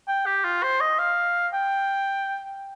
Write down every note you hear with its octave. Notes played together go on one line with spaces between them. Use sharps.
G5
G4
F4
C5
D#5
F5
G5